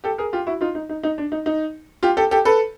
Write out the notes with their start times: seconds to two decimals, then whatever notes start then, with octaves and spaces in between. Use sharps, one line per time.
0.04 G4 A4
0.18 G#4 A#4
0.33 F4 G4
0.47 E4 F#4
0.61 D#4 F4
0.75 D#4
0.89 D#4
1.03 D#4
1.18 D4
1.32 D#4
1.46 D#4
2.03 F4 G4
2.17 G4 A4
2.31 G4 A4
2.45 A4 B4